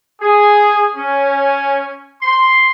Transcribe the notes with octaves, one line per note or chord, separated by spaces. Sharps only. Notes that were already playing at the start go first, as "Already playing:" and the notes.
G#4
C#4
C6